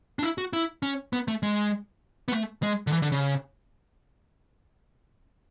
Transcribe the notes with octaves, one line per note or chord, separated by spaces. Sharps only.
D4
E4
F#4
E4
C#4
B3
A3
G#3
B3
A3
G#3
D3
E3
D3
C#3